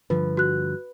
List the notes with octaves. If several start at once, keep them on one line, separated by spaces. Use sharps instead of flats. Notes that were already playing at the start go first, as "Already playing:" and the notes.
G2 D3 F3 B4
F#4 F#6